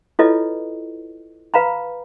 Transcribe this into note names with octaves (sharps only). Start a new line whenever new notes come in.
E4 F4 A4 B4 C#5 D#5
B4 F5 A#5 B5